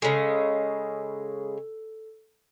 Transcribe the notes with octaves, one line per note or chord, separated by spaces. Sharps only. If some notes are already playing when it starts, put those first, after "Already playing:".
C#3 G#3 A4